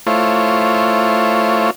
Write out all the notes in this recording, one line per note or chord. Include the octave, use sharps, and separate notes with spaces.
A3 E4 F4 C5 C#5